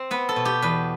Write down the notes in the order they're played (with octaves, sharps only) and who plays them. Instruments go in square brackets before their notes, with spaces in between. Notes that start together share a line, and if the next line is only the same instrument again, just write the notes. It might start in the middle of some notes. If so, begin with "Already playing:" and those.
Already playing: [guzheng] C4
B3 B4
A4
B2
G4
E2 B4